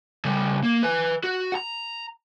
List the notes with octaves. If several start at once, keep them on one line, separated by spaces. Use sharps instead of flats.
C#3 G3
A#3
B4 G#5
F#4
F#5 A#5